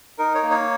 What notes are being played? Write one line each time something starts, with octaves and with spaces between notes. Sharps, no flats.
D#4 A#4
C#5
A#3
C#5